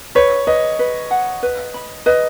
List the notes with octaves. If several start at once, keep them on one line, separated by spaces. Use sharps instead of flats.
B4 C#5
B4 D#5
B4
F#5
B4
B5
B4 D#5